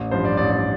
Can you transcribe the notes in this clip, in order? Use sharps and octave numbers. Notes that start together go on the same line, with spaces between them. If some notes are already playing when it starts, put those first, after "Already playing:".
Already playing: A1
G2 F3 C5
D5
A1 D5
D5